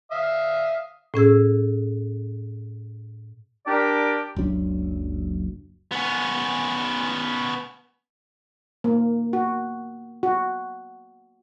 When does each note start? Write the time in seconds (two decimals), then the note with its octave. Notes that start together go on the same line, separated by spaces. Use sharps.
0.11 E5 F5 D#6
1.14 A2 C#4 G#4 E6
3.67 D4 G4 A#4 D5
4.36 F#1 C#2 F#3 D4
5.92 B3 C#4
8.84 A#3
9.33 F#4
10.23 F#4